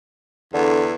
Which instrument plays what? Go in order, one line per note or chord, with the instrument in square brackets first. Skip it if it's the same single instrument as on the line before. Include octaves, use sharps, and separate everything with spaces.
[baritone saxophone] E2 [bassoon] D3